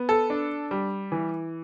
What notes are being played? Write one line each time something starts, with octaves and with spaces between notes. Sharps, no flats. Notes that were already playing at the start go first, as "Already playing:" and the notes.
Already playing: B3
A4
D4
G3
E3